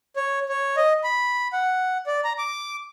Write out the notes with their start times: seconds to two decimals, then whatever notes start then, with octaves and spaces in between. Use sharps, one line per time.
0.16 C#5
0.49 C#5
0.76 D#5
1.04 B5
1.53 F#5
2.07 D5
2.24 A#5
2.38 D6